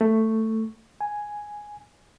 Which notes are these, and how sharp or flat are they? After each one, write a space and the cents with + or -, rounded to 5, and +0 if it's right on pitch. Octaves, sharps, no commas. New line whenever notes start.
A3 +10
G#5 +0